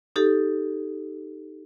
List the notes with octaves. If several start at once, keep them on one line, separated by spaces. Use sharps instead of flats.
D#4 G4 A4